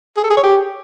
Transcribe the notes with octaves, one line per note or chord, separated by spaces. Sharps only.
G#4
A4
G#4
C#5
G4